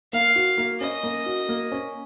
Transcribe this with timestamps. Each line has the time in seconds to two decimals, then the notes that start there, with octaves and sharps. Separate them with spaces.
0.13 A#3 F5
0.36 F#4
0.58 A#3
0.81 C#4 D#5
1.04 A#3
1.26 F#4
1.49 A#3
1.72 C#4